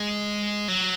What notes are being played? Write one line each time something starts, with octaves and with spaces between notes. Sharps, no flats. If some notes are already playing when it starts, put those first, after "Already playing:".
Already playing: G#3
F#3